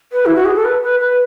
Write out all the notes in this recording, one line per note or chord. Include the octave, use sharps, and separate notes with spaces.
B4
E4
F#4
G#4
A4
B4
B4
B4